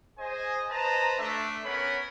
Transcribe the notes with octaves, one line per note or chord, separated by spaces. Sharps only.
G#4 C5 D#5 G#5
B4 C5 D#5 A5 A#5
A3 D4 E5
B3 C#4 A#4 C#5 F#5 B5